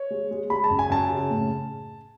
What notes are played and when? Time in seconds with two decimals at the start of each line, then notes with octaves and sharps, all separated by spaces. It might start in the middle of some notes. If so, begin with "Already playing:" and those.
Already playing: C#5
0.11 G#3
0.31 G#3
0.50 G#3 B5
0.64 A5
0.70 F#2
0.79 G#5
0.90 F#2 A5
1.10 C#3
1.30 A2